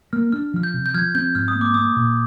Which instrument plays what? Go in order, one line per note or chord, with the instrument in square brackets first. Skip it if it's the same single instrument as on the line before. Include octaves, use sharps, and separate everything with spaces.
[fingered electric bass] A#3 [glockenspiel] F6
[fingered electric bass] D4 [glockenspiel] F6
[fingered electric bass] F3 [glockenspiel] F6
[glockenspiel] G6
[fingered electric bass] C3
[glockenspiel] G6
[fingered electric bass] F3 [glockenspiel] F6 G#6
[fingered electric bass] C4 [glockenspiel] G6
[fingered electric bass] G#2 [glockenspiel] F6
[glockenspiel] D#6
[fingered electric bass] A#3
[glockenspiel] D6
[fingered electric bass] A#3 [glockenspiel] D#6
[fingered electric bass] A#2